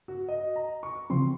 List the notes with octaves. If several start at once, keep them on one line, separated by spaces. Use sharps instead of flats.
F#4
D#5
A#5
C#6
C#3 F3 C4 C6